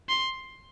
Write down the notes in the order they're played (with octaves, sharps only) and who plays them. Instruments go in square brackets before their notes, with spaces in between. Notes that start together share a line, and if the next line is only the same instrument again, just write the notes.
[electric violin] C6